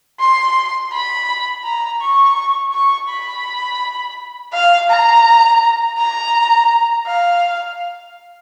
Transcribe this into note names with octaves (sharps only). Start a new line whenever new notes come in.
C6
B5
A#5
C#6
C#6
B5
F5
A#5
A#5
F5